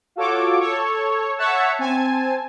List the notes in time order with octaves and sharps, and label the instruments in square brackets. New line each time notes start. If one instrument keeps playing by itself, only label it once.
[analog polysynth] F4 F#4 A4 C#5 D6
A4 C#5
C#5 E5 F#5 A5
C4 G#5 A5